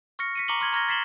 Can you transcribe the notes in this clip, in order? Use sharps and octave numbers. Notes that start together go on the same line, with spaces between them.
C#6 F6 A#6 C#7
B6 C#7 D#7
A#5 C#6 D6 C#7 F#7 G7
C6 F6 G#6 F#7 G7
A#5 C#6 F6 G#6 A#6 G7
A6 B6 C7 E7 F#7 G7